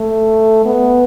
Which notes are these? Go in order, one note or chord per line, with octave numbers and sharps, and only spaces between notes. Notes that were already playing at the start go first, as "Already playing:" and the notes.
Already playing: A3
B3